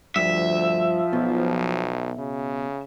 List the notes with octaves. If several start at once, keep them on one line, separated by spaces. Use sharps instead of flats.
D2 G2 F3 E5
B1 B2
C#3